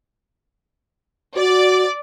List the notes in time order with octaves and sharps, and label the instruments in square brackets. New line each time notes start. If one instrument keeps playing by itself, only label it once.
[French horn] F#4 [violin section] D5